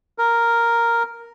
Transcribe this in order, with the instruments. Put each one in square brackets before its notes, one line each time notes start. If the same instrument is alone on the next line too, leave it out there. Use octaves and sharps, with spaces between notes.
[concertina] A#4